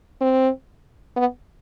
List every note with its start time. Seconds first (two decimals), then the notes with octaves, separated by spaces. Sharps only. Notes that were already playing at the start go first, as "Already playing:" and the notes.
0.21 C4
1.16 B3